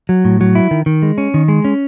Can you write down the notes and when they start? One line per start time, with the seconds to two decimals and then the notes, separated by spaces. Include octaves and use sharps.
0.09 F#3
0.25 A2
0.41 F#3
0.55 E4
0.71 D#3
0.86 D#3
1.02 G#3
1.18 C#4
1.34 D#3
1.48 G#3
1.65 C#4